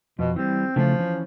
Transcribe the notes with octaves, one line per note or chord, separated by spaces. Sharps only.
F2 B2
E3 G3 C4
C#3 E3 F3 A3
E3 C#4